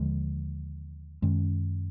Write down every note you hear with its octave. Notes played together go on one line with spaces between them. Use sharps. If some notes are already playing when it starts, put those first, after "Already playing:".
Already playing: D#2 D3 F3 G#3
F#2 D#3 G#3 C#4